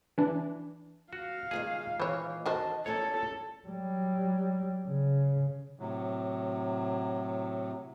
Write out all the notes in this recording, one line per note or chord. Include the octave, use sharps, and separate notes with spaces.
E3 D4
F#4 F5
A#2 D#3 G#3 G#4
E3 C5 C#5
D#3 F#4 A4 C5 D#5 A5
E2 A#3 C#4 A4 C#5
F#3 G3
C#3
A2 C3 F#3